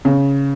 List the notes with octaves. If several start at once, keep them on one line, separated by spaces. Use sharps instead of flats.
C#3